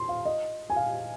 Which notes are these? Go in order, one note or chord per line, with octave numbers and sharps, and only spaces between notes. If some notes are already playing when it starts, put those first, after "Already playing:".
Already playing: C6
F5
D#5
G#5
F5